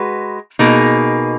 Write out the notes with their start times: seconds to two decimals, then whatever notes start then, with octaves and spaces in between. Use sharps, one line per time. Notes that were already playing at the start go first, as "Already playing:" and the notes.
Already playing: G#3 F#4 B4
0.59 B2 A#3 D#4 G#4